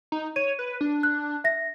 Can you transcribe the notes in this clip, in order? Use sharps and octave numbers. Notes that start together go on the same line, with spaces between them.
D#4
C#5 D#7
B4
D4
F#6
E5 A#6